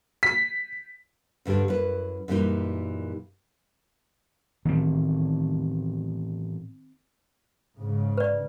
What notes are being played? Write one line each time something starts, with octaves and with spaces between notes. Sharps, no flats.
B6
D2 G2 D3 G4 D5
F#2 E4 B4
F#2 A#2 E3 G3 C4 D#4
A2 D#3 E3 B3 C4
G#2 C#3
B4 D5